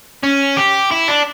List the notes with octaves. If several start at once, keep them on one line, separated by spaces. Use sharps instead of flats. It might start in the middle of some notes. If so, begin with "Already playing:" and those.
C#4
G4
E4
D4